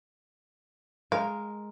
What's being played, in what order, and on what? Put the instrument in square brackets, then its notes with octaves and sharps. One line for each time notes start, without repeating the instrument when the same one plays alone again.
[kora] G#3 A#4 [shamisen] F5